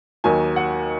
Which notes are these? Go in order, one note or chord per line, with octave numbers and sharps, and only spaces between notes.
D#2 D#3 F#3 G#5
F#5